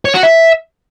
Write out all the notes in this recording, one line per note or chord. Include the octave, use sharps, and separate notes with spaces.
C#5
F#4
E5